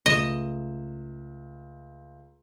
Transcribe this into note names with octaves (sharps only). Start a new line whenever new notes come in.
C#2 A3 D#5 E7